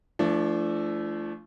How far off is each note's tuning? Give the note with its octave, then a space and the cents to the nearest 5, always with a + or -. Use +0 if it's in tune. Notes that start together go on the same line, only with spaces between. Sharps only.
F3 -35 A3 +0 D4 +0